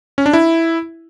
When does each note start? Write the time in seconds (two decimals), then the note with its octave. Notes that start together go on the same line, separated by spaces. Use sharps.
0.18 C#4
0.26 D4
0.33 E4